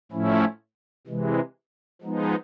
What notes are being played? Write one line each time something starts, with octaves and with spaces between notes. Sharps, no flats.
A2 F3 A3 C#4 E4
C3 E3 G#3
F3 G#3 B3 D#4